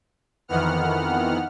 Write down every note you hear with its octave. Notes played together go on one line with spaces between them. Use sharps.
F2 D#3 E3 B3 F#5 F6